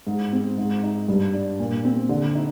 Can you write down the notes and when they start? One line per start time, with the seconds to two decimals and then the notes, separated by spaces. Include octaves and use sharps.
0.07 G#2
0.33 C4
0.58 G#2
0.83 D#4
1.08 G2
1.33 D4
1.59 A#2
1.85 C4
2.09 D3
2.35 D#4